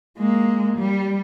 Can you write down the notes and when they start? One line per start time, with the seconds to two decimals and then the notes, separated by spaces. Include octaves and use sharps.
0.18 G#3 A#3
0.77 G3